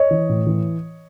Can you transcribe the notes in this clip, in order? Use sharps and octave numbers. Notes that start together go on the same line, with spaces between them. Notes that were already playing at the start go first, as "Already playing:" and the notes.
Already playing: C#5 D#5
E3
A2
E3